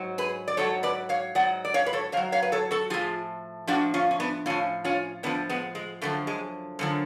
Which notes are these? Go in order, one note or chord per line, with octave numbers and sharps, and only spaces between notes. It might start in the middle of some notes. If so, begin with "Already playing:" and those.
Already playing: G#2 F#3
G#4 B4
D5
G#2 F#3 A4 C#5
B4 D5
C#5 F5
G#2 F#3 D5 F#5
D5
C#5 F5
B4
A4 C#5
G#2 F#3 C#5 F5
C#5 F5
B4
A4 C#5
F#4 A4
A2 F3 F4 G#4
A2 F3 D4 F#4
C#4 F4
C#4
B3 D4
A2 F3 C#4 F4
C#4 F4
A2 F3 B3 D4
G#3 B3
G#3
F#2 D3 F3 A3
G#3
F#2 D3 F3